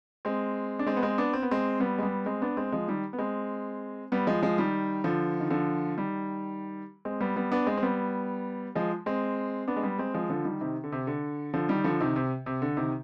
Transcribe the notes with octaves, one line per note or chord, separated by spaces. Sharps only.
G#3 C4
D4
G#3 C4
B3
G#3 C4
B3 D4
C4
B3
G#3 C4
G3 B3
G#3
G3 B3
G#3 C4
B3 D4
G#3 C4
F3 G#3
D#3 G3
B3
G#3 C4
G3 B3
F3 G#3
F3 G#3
D#3 G3
D3 F3
D#3
D3 F3
D#3 G3
G#3 C4
G3 B3
G3 B3
B3 D4
G#3 C4
C4
G3 B3
F3 G#3
G#3 C4
B3 D4
G#3
G3 B3
G#3 C4
F3 G#3
D3 F3
D#3 G3
C3 D#3
D3
C3
D3
D3 F3
D#3 G3
D3 F3
C3 D#3
C3
C3
D3
C3 D#3